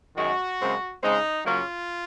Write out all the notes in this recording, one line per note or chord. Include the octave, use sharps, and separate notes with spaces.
F#2 D#3 G#3 F#4
F#2 C#3 G#3 C4
C#3 G#3 C4 D#4
C#3 F#3 A#3 C#4 F4